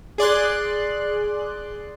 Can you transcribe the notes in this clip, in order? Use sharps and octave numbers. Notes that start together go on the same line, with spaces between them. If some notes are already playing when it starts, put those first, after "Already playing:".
G#4 D5 C6 F#6